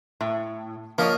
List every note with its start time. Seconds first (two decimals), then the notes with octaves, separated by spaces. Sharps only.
0.21 A2
0.98 F3 A#3 A#4 C#5 D#5